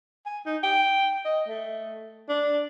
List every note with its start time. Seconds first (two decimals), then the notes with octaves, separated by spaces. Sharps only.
0.26 G#5
0.46 D#4
0.63 G5
1.25 D#5
1.49 A3
2.29 D4